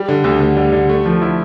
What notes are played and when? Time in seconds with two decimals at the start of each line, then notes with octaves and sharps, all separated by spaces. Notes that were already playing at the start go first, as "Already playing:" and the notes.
Already playing: G3
0.08 D3
0.24 D2
0.40 D2
0.56 G3
0.72 D3
0.89 A3
1.05 F3
1.22 E4